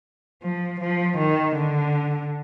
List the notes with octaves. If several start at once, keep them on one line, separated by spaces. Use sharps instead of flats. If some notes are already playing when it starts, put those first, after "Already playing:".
F3
F3
D#3
D3